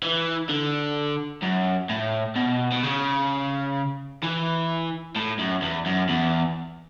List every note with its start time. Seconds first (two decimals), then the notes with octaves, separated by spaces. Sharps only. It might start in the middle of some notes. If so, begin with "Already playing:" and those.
0.03 E3
0.49 D3
1.43 F#2
1.89 A2
2.36 B2
2.72 B2
2.83 C#3
4.23 E3
5.16 A2
5.39 F#2
5.62 E2
5.86 F#2
6.09 E2